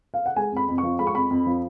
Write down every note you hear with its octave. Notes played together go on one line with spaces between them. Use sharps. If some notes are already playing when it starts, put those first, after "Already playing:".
F5
F#5
G#3 G#5
F2 B5
F2
C#6
F3
G#3 B5
C#6
F2 B5
F2
F3